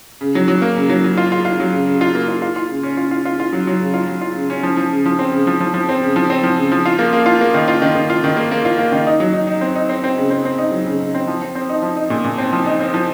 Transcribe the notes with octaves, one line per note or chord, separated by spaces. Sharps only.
C#3
F#3
F#3
A#3
C#3
F#3
F#3
F4
F4
F4
F#3
C#3
C#3
F4
A#3
F4
F4
F4
C#3
C#4
F4
F4
F4
F4
F#3
F#3
C#3
F4
F#3
F4
C#3
C#4
F3
F3
C#3
F3
C4
C#3
F3
F3
F3
C4
C#3
F3
C4
F3
C#3
F3
F4
A#3
A#3
F4
A#3
D#3
F4
D#3
D#3
F4
D#3
A#3
A#3
F4
A#3
D#3
D#4
F#3
D#4
D#4
C4
D#4
C4
C4
C#3
C4
C4
D#4
F#3
C#3
C#3
C4
F3
C4
C4
D#4
F3
D#4
A#2
A#2
C4
F3
D#4
C4
F3